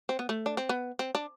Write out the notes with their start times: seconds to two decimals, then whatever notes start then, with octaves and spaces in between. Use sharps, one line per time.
0.09 C4
0.19 B3
0.29 A3
0.46 D4
0.57 C4
0.69 B3
0.99 C4
1.15 D4